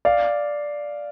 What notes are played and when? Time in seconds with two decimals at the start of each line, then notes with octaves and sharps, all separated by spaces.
0.05 D5 F5